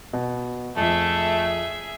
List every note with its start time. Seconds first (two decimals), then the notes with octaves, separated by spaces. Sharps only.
0.13 B2
0.77 F2 F3 A3 G#4 E5